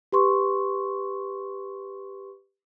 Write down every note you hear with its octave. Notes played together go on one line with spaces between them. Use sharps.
G4 B4 C6 C#6